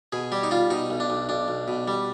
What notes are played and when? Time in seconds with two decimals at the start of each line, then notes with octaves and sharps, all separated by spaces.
0.12 B2 G#4
0.32 G3 G4
0.43 D#4
0.51 G3 F4
0.70 B2 D#4
0.90 B1
1.00 D4
1.10 B1
1.29 B1 D4
1.48 B1
1.68 B2
1.88 G3